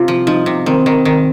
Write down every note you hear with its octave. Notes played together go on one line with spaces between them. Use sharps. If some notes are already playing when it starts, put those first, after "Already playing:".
Already playing: C3 F4
F3
F3 D#4
C3
D#3 C4
D#3
D#3